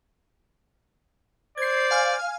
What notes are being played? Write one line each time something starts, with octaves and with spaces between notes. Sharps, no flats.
C5 D5 G#6 C7
F5 G#5 F6